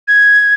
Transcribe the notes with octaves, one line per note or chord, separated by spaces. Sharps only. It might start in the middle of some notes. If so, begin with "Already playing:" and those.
G#6